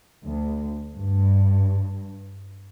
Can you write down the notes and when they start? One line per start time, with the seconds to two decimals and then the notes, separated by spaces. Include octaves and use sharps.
0.25 D2
0.94 G2